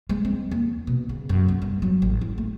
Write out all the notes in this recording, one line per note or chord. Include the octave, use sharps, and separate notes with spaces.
G#3
C4
D#2
B2
C#3
F#2
B1
G2
F#3
A1
E4
A3